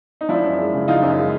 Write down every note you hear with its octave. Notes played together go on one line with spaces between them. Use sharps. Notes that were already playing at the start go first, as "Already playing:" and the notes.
D#4
F3 D4 E4
F#2
G#3
C#3
F3 D#4 F4
F#2
G#3